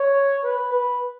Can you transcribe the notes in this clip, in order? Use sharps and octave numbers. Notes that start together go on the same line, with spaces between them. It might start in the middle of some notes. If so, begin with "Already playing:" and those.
Already playing: C#5
B4
B4